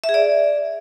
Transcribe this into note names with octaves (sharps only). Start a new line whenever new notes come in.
E5
G#4
D5